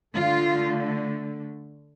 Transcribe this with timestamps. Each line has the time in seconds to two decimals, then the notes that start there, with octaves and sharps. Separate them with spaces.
0.15 D3 A3 F4